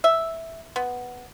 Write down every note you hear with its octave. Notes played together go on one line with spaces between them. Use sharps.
E5
B3